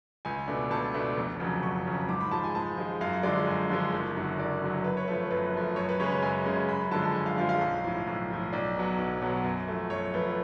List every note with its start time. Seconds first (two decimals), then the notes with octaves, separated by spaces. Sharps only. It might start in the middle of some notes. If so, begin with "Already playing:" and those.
0.25 C#2 G#5
0.48 B2 A3 D4
0.70 C#2 A5
0.94 B2 A3 D4
1.17 F1
1.40 F2 C#3 F#3
1.63 F1 C#6
1.85 F2 C#3 F#3
2.08 G#2 D6
2.21 B5
2.31 F3 G#3 A5
2.44 G#5
2.55 G#2 A5
2.78 F3 G#3
3.01 F#2 F5
3.23 D3 F3 G#3 D5
3.47 F#2
3.70 D3 F3 G#3
3.93 F#1
4.16 F#2 D3 F#3
4.39 F#1 D5
4.62 F#2 D3 F#3
4.84 F#2 B4
4.97 C#5
5.08 F3 A3 B4
5.31 F#2 B4
5.54 F3 A3
5.76 F#2 C#5
5.89 B4
6.00 C#3 G#3 C#4 C#5
6.12 C#5
6.22 F#2 G#5
6.46 C#3 G#3 C#4
6.68 F#2 B5
6.91 D3 F3 G#3 A5
7.04 A5
7.15 F#2 G#5
7.26 F5
7.37 D3 F3 G#3 F5
7.49 F5
7.61 B1
7.84 A2 F3
8.07 B1
8.30 A2 F3
8.53 B1 D5
8.76 B2 F#3
8.98 B1
9.22 B2 F#3
9.44 F#2
9.68 F3 A3
9.90 F#2 C#5
10.14 F3 A3 B4